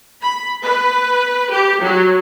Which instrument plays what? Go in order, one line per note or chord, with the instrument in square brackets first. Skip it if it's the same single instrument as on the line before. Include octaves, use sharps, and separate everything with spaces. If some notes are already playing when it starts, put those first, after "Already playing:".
[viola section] B5
B4
G4
F#3